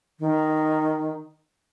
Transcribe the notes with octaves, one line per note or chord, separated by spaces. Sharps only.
D#3